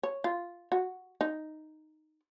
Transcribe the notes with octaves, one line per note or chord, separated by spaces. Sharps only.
C#5
F4
F#4
D#4